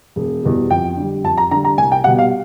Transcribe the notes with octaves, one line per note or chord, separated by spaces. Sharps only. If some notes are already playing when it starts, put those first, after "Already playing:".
E1
E2 B2 G3
F2 G5
D3 G3
F2 A5
A#5
D3 G3 A#5
A#5
C2 G#5
G5
B2 G3 F#5
F5